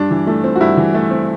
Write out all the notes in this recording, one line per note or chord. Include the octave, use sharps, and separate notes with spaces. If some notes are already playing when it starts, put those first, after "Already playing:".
Already playing: G2 D4
E3
A3
C4
F#4
G2 E4
E3
A3
C4